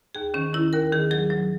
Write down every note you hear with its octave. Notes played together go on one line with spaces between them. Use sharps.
D#2 G#4
D#3 C#4
D#3 E4
D#2 A#4
D#3 G#4
F#3 G#4
F#3